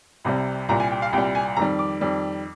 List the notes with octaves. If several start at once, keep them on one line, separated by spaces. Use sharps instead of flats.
C2 C3 G3
C2 A#2 G3 A#5
G#5
G5
F5
C2 A#2 G3 G5
G#5
F2 D#3 G3 A#5
D6
F2 D#3 G3